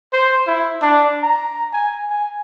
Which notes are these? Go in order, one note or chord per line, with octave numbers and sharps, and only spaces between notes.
C5
E4
D4
A#5
G#5
G#5